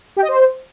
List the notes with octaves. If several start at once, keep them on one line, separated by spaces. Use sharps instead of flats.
G4
D#5
C5